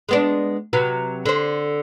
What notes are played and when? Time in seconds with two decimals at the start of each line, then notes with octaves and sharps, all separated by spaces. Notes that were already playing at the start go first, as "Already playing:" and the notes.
0.09 G#3 B3 D4
0.73 C3 F#3 B4
1.26 D3 C5